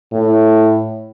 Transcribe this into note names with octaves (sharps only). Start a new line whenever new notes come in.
A2